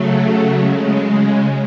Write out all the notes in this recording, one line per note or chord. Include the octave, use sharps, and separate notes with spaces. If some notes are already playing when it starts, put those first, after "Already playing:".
Already playing: C#3 F#3 A3
C#3 G#3